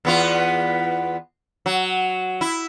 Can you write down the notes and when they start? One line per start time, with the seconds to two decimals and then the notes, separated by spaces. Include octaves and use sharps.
0.05 E2 B3 F4
1.66 F#3
2.41 E4